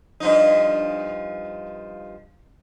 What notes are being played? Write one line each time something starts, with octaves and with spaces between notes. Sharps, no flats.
G2 F3 D#4